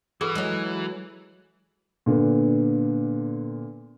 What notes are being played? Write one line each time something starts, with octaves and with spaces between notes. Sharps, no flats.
E3 F#4 G#4 A4 B4
F#3 G#3
A#2 D3 B3